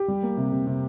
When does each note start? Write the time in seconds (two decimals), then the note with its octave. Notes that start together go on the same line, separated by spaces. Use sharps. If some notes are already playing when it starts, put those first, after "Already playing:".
Already playing: G4
0.08 G3
0.23 A#3
0.37 C3
0.52 C3
0.67 C3